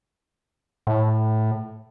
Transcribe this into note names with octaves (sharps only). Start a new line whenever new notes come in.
A2